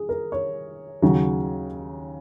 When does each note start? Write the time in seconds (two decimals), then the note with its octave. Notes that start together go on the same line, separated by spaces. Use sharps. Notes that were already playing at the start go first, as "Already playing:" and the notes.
Already playing: G#4
0.09 A#4
0.32 C#5
1.02 D#2 C#3 F#3